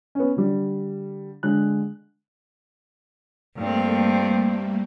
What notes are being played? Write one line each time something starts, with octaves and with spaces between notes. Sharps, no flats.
B3 C#4
D3 G3
D3 G#3 F#6
G2 G3 A3 A#3 C4